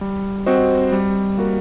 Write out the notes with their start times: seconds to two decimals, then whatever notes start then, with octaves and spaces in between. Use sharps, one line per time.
0.01 G3
0.46 C4 F#4 C5 D#5
0.92 G3
1.38 A#3 F#4 A#4